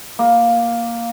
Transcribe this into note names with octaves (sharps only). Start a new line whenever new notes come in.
A#3